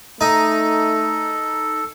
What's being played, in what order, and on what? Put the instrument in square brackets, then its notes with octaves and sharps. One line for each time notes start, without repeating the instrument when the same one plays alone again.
[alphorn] A3 [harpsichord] D#4 [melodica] A4